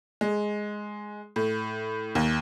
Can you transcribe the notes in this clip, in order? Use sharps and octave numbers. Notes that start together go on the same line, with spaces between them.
G#3
A2
D#2